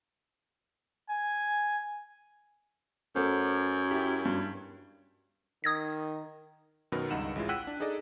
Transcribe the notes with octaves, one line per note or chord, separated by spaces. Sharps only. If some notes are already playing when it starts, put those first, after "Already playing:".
G#5
F#2 A3 C5
E4 G4
G2
D#3 D#6 G#6 A#6
F#2 B2 D#3 A#4 B4 B5
C#2 G2 D#4 F#5 E7
A1 G#3 E4 F4
F#5 G5 E6 F#6 B6 D#7
D4
D#4 G#4 A4 D5 D#5